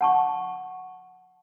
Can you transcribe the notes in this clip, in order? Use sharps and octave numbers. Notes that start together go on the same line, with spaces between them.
F#5 A5 C#6